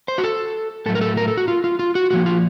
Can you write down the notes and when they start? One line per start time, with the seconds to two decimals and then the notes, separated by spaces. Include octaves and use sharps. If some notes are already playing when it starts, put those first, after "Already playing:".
0.08 C5
0.18 F#4
0.24 A4
0.86 A2 F#3 A3 A4
0.95 A#4
1.01 A4
1.17 A#4
1.28 A4
1.37 F#4
1.48 F4
1.64 F4
1.79 F4
1.95 F#4
2.11 A2 F#4
2.14 F3 A#3
2.26 F4